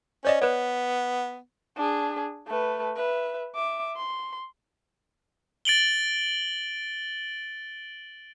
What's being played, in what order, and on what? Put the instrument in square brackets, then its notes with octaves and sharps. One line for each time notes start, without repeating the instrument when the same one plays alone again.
[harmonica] C#4 [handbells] C5 D5 D#5
[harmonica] B3 [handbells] B4 C#5
[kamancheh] D4 G#4
A3 B4
B4 E5
E5 D6
C6
[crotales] A6 D7 F#7 G7